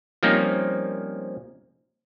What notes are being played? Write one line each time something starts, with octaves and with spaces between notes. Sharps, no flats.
F3 G3 A#3 C4 C#4 D#4